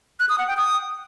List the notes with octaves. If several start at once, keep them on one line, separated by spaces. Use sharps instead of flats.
F#6
D#6
F#5
G5
D#6